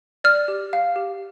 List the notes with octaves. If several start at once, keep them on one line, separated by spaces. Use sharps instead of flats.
D5 F6
G4
F5
G4